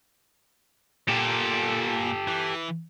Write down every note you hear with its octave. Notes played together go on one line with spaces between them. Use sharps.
A#2 G4 A4
E3